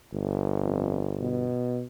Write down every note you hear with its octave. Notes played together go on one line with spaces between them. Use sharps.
G1
F2
B2